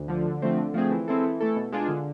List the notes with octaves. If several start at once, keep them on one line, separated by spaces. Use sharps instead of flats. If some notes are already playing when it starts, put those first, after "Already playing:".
Already playing: D2
D3 F3
D3
F3 A3 C4
D3
F3 A3 C4 G#4
E3
G#3 C4 E4 A4
E3
A3 E4 A4
B2
G#3 D4 F4 G#4
D3